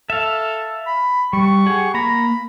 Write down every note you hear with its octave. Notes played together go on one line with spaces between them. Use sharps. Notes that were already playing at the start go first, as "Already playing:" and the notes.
A4 E5 F5
B5
G3 C#6
G4 G#4 F#5
A#3 A#5 B5